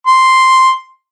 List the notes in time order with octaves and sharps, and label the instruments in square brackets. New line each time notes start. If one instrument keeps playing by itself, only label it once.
[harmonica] C6